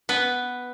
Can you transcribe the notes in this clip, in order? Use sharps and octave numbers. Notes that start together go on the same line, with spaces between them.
B3 B4